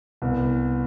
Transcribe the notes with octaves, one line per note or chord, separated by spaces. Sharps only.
C2 B3